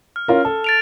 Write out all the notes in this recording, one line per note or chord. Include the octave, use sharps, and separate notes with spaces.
F6
C#4 F4 A#4
A4
A6 D7 F7